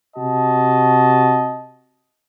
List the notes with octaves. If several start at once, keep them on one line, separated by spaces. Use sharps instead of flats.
C3 F#4 D#5 A5